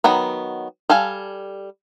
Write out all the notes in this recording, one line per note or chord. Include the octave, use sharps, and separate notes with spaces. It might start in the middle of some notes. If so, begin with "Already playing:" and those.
D#3 F#3 B3 B5
G3 A4 F5 G#5